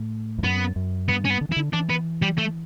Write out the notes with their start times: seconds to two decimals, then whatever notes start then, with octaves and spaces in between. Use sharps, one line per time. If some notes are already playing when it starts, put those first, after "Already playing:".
Already playing: A2
0.38 E2
0.44 F#2 B3
0.76 F#2
1.08 G2 B3
1.25 C#4
1.30 B3
1.41 D3
1.49 E3
1.52 E4
1.56 D3
1.73 E3 D4
1.90 B3
2.22 G3
2.38 A3